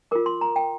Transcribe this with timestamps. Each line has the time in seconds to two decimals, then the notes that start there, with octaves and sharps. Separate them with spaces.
0.11 F4 A#4 D6
0.26 C6
0.41 A#5
0.56 G5